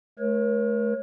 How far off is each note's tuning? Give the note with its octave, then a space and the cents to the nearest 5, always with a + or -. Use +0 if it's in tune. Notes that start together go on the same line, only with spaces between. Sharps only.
A3 -30 A#4 +40 C#5 -20